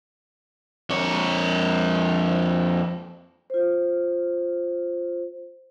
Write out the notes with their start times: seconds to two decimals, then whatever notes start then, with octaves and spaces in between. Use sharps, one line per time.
0.90 F2 C#5
3.50 F4 C5